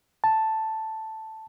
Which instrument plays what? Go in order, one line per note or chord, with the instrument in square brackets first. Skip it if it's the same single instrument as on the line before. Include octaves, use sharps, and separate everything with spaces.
[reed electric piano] A5